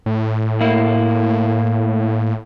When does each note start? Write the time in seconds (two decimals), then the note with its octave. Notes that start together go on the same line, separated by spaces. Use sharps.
0.06 A2
0.61 A#3 E4